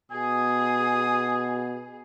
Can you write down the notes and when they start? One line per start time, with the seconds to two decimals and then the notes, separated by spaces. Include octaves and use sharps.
0.12 B2 G#4 G#5 D#6